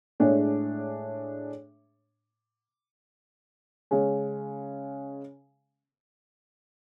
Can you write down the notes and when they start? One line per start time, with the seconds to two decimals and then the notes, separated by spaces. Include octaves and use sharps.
0.20 A2 G#3 D4 G#4 C#5
3.91 C#3 G#3 C#4